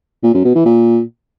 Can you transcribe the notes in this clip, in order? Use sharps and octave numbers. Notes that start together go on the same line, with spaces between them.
A#2
F#2
B2
E3
A#2